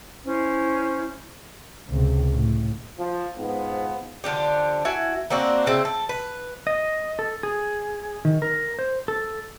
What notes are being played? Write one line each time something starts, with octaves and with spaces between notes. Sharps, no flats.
C#4 E4 C5
C#2 C3
A2
F3
G#2 F3 B3
D3 F3 D4 G4
E4 F#4 G#5
A#3 C4 D4 F#4
C#3 C4 E4
A4
B4
D#5
A4
G#4
D#3
A#4
C5
A4